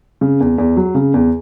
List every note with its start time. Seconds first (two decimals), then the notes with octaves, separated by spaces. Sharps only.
0.21 C#3
0.40 E2
0.58 E2
0.77 F#3
0.95 C#3
1.14 E2